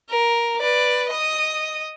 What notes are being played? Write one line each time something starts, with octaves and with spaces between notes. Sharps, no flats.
A#4
B4 D5
D#5 D#6